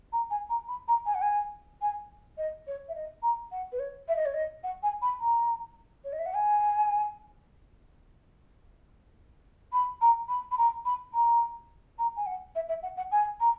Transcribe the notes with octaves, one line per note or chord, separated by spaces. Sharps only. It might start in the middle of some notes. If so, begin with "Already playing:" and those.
A#5
G#5
A#5
B5
A#5
G#5
F#5
G#5
G#5
D#5
C#5
E5
D#5
A#5
F#5
B4
C#5
E5
D#5
C#5
D#5
F#5
G#5
B5
A#5
C#5
D#5
E5
F#5
G#5
B5
A#5
B5
B5
A#5
B5
A#5
A#5
G#5
F#5
E5
E5
F#5
F#5
G#5
A#5